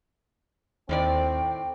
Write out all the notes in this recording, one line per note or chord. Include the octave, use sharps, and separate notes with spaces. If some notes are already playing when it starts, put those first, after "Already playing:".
D#2 A2 D#3 C4 D5 G5